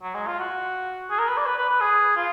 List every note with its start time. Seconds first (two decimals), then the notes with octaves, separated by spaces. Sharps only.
0.03 F#3
0.15 G#3
0.27 F4
0.39 F#4
1.10 G#4
1.19 A#4
1.28 B4
1.37 D5
1.46 B4
1.58 B4
1.69 B4
1.81 G#4
2.17 F4